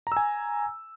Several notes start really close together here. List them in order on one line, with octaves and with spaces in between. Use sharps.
A#5 E6 G#5